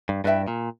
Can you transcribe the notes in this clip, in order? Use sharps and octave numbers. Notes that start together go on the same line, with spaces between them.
G2
G2 E4 B4 E5 G5
A#2